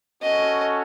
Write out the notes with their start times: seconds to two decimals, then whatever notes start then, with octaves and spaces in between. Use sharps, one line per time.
0.22 C#4 F#4 A4 D#5